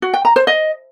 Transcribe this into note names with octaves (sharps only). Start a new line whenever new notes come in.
F#4
G5
A#5
C5
D#5